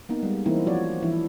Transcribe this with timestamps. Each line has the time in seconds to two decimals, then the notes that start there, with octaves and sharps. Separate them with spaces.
0.09 A#3 B3 D#4
0.23 G3 G#3
0.46 E3 A#3 C4 D#4 E4
0.67 F3 F#4 C#5 D5
1.02 E3 F3 D4 E4